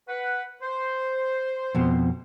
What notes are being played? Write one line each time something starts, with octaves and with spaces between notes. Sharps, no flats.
B4 F#5
C5
F2 B2